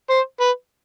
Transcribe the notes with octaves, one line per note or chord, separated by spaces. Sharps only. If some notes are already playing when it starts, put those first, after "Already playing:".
C5
B4